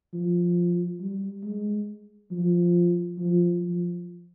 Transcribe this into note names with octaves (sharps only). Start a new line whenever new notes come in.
F3
G3
G#3
F3
F3
F3